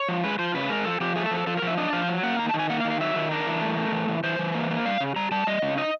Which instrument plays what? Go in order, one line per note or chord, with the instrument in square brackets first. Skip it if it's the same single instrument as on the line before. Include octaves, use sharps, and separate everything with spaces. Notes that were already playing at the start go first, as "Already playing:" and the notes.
Already playing: [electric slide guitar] C#5
F3
G#3 B4
F3 C5
C#3 B4
G#3 A#4
F3 A4
F3 G4
A3 G#4
A4
F3
A4
F3 A4
F3 A#4
E5
D4 D#5
F3 F5
F#3
A#3 F#5
D#3 A#5
A5
D#3
G#5
A#3 F#5
F5
D#3
F5
F#3 E5
D#3
D4 A#4
E3
A3
A3
E3
E3
E3 C5
E3
A#3
A#3
G3 F5
C#3
G3 A#5
G3 A5
G3 D#5
C#3
D#4 D#5